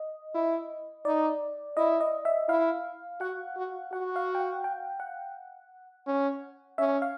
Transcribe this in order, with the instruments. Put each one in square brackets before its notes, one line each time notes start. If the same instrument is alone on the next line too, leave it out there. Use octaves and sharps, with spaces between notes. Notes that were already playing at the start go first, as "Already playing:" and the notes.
Already playing: [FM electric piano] D#5
[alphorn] E4
[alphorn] D#4 [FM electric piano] D5
[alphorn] E4 [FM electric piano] D#5
[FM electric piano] D#5
E5
[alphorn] E4 [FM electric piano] F5
[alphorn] F#4 [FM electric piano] F#5
[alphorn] F#4
[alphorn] F#4 [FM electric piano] F#5
[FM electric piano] F5
G5
F#5
G5
F#5
[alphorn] C#4
[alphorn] C#4 [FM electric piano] E5
[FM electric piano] F5